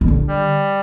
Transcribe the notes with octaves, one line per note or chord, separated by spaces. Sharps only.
D#3
D3
G3